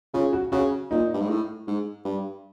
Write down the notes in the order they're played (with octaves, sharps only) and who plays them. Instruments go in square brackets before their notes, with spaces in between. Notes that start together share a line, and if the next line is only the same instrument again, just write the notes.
[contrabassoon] C#3 [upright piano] F4
[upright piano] F#4
[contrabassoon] C#3 [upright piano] F#4
[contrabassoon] A#2 [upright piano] D#4
[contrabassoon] G2
G#2
A2
G#2
G2